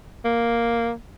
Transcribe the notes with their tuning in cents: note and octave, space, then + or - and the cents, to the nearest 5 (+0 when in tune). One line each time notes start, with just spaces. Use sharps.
A#3 +0